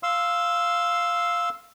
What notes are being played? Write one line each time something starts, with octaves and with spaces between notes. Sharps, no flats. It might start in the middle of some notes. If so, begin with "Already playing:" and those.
F5 C6 E6